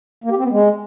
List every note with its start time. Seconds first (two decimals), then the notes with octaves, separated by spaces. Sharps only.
0.24 A#3
0.31 G4
0.37 C4
0.44 B3
0.51 G#3